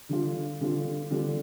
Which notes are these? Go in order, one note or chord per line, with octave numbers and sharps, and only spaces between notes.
D3 G3 D4 F4
D3 G3 D4 F4
D3 G3 D4 F4